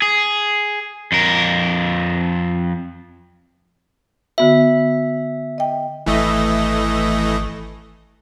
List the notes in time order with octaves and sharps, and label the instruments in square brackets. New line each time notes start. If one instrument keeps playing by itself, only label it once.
[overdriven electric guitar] G#4
F2 A#4
[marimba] D3 B3 F#4 [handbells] E5
[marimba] D#5 G5
[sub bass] G#1 [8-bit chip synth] E3 A3 D#5